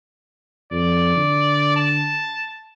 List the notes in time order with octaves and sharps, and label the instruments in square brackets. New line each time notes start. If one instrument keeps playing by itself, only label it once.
[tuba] F2 [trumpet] D5
[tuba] D3
[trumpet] A5